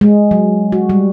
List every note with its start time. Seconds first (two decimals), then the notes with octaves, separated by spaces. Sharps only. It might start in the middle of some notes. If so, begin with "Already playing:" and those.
0.01 G#3
0.31 F#3
0.72 F#4
0.89 G3